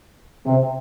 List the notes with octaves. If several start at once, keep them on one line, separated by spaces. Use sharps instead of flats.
C3